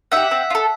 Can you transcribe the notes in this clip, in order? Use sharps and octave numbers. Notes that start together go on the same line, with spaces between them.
D#4 G4 E5 F#5
C4
F4
A4